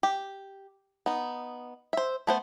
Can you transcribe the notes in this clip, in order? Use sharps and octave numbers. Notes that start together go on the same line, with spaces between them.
G4
B3 D#4
C5 E5
A3 B3 C5